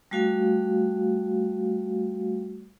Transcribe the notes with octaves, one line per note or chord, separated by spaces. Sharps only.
G3 A3 F#4 F5